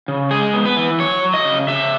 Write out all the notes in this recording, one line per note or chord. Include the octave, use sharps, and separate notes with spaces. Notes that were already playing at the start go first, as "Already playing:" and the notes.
C#3
G#3 G#4
B3
B4
E3
F#3 C#5
F#3
D#5
C#3
C#3 E5